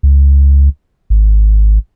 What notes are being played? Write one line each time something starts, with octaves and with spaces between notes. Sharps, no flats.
C#2
G#1